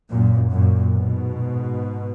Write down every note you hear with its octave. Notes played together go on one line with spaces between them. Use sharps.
F#2 A#2
F#2 A#2
G#2 B2